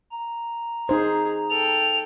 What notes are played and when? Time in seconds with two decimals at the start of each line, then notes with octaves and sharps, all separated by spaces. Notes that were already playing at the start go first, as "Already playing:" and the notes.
0.12 A#5
0.89 D#4 G#4 C5
1.50 A4 G5 F7